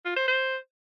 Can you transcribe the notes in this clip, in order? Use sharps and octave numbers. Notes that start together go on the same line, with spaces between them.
F4
C5
C5